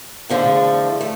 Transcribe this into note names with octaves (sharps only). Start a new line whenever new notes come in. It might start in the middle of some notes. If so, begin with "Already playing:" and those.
E2 D3 F3 A3
A3